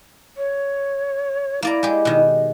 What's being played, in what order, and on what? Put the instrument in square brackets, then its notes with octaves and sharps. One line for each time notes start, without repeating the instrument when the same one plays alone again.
[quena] C#5
[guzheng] A#3 D5 A#5 [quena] E4
[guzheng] G#3 G4
B2 D#3